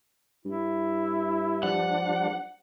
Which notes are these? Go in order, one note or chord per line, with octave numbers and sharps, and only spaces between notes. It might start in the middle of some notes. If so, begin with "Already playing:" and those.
G2 E4
F3 G3 D4 F#5